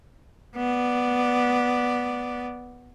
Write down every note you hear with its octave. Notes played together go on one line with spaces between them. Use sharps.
B3 D5